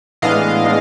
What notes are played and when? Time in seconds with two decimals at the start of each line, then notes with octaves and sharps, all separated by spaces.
0.22 A2 E3 G#3 B3 D4 D#5 F5
0.65 A2 E3 G#3